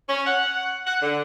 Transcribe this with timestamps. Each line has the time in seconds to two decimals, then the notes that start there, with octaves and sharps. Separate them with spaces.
0.08 C#4
0.26 F#5
0.86 F#5
1.02 D3